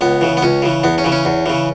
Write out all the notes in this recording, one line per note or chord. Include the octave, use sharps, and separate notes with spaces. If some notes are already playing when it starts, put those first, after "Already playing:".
C#2 B3
C#3 E3
B3
C#2 C#4
C#3 E3
E2 B3
C#4
C#3 E3
C#4
E2
C#3 E3